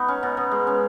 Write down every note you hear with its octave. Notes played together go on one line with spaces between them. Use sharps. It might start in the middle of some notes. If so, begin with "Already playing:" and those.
Already playing: B3 D#4
C#4
B2
B2
G#3
C#4